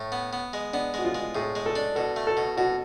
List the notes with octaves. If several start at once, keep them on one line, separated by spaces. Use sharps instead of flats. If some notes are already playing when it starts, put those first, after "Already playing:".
Already playing: A2
B3
B3
G#3
B3 D4
G#3 F#4
F4
G#3
A2 G#4
G#3
A4
D4
B2 A4
A3
A4
B2
B2 F#4